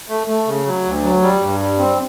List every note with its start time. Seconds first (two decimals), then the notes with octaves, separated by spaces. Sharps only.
0.09 A3
0.27 A3
0.47 C#3
0.66 F#3
0.85 D2
1.04 F#3
1.22 G3
1.42 G2
1.60 G3
1.79 C4